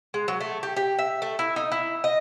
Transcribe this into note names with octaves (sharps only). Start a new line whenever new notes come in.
G#3
F#3
A3
G4
G4
E5
A3
E4
D#4
E4
D#5